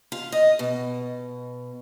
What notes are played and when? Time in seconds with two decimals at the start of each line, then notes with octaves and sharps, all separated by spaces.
0.12 F4
0.32 D#5
0.59 B2